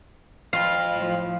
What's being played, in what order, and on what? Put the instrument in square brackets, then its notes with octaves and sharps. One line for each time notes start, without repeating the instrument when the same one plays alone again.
[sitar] F2 F4 [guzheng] F5
[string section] A2 F3